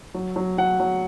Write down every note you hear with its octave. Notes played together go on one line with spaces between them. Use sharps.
F#3
F#3
F#3 F#5
F#3